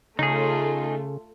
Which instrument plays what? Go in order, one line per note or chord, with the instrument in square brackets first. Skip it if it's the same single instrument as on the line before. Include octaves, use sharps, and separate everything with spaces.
[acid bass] C#3 [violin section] A3 F4 [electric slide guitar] D#4 G#4